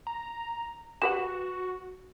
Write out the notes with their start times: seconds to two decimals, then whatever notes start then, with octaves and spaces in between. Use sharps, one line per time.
0.07 A#5
1.02 F#4 G4 B4 F#5 E7